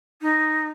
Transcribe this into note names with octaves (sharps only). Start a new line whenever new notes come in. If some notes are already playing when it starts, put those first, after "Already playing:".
D#4